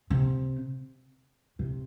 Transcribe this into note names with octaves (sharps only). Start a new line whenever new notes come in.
C3
C3